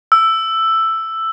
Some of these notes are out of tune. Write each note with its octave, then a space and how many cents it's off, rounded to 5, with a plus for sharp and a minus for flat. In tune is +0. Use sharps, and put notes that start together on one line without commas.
E6 +5